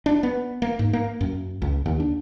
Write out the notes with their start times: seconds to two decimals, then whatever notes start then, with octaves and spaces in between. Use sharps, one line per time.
0.06 D4
0.23 B3
0.62 A#3
0.79 G#2
0.93 A#3
1.21 F#2
1.62 C#2
1.86 D#2
2.00 D4